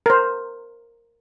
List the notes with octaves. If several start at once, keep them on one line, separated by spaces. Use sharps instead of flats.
A#4 C5